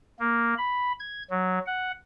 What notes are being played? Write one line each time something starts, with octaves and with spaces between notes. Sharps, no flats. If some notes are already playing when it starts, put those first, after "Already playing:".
A#3
B5
G#6
F#3
F#5